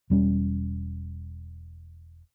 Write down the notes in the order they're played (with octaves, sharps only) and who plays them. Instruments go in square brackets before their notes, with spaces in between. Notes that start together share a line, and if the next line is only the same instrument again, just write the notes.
[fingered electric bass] E1 G3 C#4